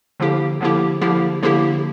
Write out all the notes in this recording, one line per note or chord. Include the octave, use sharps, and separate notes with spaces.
D3 F3 A#3 E4 G4
D3 F3 A#3 E4 G4
D3 F3 A#3 E4 G4
D3 F3 A#3 E4 G4